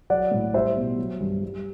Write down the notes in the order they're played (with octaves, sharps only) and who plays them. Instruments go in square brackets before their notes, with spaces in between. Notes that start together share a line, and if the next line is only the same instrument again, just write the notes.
[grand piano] F#3 D5 F#5
A2
G3 C5 E5
B2
F#3
G2
G3